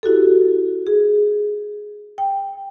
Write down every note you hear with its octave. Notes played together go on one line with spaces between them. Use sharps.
E4 F#4 G4 A4
G#4
G5